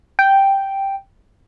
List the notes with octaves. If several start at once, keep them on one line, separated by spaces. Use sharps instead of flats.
G5